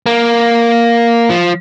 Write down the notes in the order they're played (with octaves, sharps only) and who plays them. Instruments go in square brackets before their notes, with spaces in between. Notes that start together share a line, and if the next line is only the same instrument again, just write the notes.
[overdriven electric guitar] A#3
F3